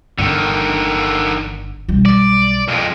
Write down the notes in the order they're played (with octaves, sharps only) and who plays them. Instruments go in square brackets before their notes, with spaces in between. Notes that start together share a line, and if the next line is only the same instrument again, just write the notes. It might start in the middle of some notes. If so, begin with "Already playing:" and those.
[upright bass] G1 [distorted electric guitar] D3 D#3
[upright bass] B1 G3
[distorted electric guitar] D5
F2 G#3